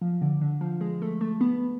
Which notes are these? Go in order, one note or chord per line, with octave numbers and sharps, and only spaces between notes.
F3
D3
D3
F3
G#3
A3
A3
B3